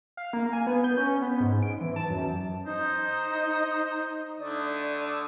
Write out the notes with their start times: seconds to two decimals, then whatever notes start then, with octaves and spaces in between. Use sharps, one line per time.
0.17 F5
0.33 A#3
0.53 G#5
0.67 B3
0.84 G6
0.97 C#4
1.22 B3
1.40 G#2
1.63 D7
1.81 E3
1.96 A5
2.10 F#2
2.66 D#4 C5 D#5
4.40 D3 A3 D5 D#6